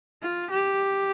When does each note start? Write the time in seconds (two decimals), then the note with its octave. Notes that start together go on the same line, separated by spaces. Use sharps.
0.22 F4
0.50 G4